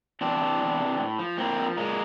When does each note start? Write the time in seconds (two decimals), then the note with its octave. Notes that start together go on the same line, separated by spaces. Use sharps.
0.21 E2 C4 D4
0.41 C3 E3
0.60 E2
0.80 C3 E3
0.99 A2
1.19 F3
1.38 A2 A#3 C4
1.58 F3
1.77 A#2 G#3 A#3